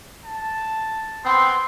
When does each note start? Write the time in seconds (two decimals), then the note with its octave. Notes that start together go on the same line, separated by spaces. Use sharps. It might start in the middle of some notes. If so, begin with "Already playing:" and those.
0.25 A5
1.25 B3 C4 C6